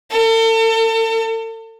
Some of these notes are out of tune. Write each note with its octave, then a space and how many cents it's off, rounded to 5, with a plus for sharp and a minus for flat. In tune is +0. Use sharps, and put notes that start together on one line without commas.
A4 +40